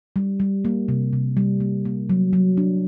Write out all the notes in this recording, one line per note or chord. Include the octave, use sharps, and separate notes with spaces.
G3
G3
A#3
C3
C3
G3
A#3
A#3
F#3
F#3
D4